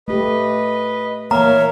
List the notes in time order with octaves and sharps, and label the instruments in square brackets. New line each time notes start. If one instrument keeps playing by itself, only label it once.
[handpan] A3 G4 [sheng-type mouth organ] B4 D#5
[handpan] E3 A#3 [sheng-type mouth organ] A#4 E5 F5 [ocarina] C#5 [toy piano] A#5